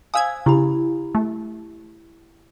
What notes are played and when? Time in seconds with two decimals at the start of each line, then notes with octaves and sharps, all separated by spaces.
0.14 C5 F5 G#5 D#6 E6 G#6
0.46 C#3 E4 G4 B5
1.15 A3